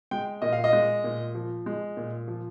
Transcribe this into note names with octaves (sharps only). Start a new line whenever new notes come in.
G#3 G5
A#2 D#5
F5
D#5
G#3
A#2
F3
G#3
A#2
F3